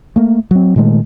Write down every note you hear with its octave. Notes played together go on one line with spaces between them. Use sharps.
A3 A#3
F#3 C4
A#2 D#3 G#3 A3